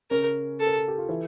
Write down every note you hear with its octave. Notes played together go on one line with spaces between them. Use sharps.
C#3 C#4 A#4
A4
A#4
A4
G4
F4
E3 E4